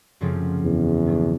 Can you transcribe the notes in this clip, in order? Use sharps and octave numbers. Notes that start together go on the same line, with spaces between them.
F#2 C#3 F3 A3 C4
E2
G2 D#3 F#3 A3 D4